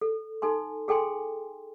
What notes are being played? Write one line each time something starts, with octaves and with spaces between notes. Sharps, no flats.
A4
D#4 A4 G#5 C6
G#4 A4 G5 G#5 C6